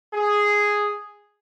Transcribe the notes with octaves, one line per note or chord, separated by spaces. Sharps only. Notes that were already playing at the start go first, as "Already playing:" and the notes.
G#4